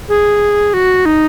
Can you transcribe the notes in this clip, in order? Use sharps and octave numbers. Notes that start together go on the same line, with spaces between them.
G#4
F#4
D#4